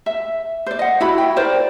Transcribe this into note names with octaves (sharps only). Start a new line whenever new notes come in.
E5
C5 D5
D#5 F#5
E4 F#4 B5
G5
A#4 C5 D5